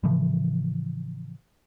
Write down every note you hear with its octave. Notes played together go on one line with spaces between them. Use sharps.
A2 C#3 E3 F3